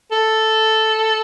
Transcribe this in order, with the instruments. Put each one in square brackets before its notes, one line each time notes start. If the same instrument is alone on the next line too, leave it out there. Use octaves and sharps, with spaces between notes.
[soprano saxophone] A4